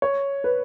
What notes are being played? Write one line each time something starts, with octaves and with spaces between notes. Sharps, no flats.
C#5
B4